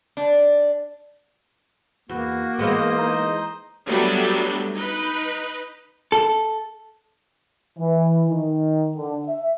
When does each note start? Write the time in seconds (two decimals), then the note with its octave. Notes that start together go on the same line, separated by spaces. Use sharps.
0.17 D4
2.09 E2 A#3 F#4
2.59 E3 G#3 B3 C5 D#5
2.98 D#4
3.88 F#3 G3 A3 B3 D4 A4
4.75 D#4 B4
6.12 A4
7.78 E3
8.30 D#3
8.97 D3
9.27 E5